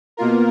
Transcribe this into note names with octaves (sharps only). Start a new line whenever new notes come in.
B2 A#3 F4 A#4